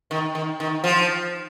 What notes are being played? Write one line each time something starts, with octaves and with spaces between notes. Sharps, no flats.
D#3
D#3
D#3
F3